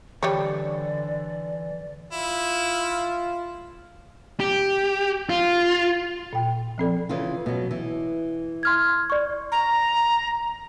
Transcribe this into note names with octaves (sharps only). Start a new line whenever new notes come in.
D3 E3 G3 C#5 D5
E4 F4
G4
F4
A#2 G5
F3 C4 A4 D5
C#3 E3 F4
B2 F#3
E3
C6 F6 G#6
D5 C#6
A#5